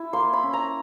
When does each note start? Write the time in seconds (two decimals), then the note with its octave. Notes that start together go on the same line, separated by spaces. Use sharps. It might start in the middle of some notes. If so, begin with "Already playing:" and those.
Already playing: E4
0.13 A#3 C6
0.33 B5
0.43 C#4
0.53 A#5